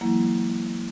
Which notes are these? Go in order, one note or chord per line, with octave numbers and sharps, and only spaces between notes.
E3 F#3 G#3 A#3 E4